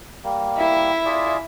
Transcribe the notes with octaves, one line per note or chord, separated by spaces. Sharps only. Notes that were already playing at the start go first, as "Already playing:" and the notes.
G3 A#3
E4 E5
F4 G#4 D5